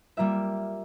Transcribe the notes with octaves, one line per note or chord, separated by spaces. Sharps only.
G3 A#3 F4 E5